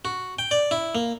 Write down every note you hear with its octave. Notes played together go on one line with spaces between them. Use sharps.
F#4
G5
D5
E4
A#3